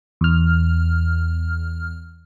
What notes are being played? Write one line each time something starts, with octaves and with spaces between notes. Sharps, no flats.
E2 F6